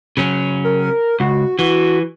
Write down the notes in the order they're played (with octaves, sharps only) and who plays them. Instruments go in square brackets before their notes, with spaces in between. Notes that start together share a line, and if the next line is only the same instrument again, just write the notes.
[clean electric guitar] C#3 F#3 C#4
[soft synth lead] A#4
[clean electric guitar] C#2 [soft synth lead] F#4
[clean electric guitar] E3 [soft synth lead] F#4